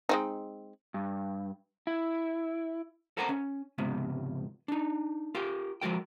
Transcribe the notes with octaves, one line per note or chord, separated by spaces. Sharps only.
G#3 C4 D#4
G2
E4
A4 A#4 C5 F#5 G5 A#5
C#4
C#2 G#2 C3 F3 B3
D4 D#4
F4 G4 A#4 G5
F3 G#3 F#4 A#4 G5